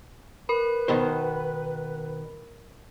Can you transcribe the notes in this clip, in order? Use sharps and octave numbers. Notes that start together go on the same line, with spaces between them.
A#4 B4 B5
B2 D#3 C5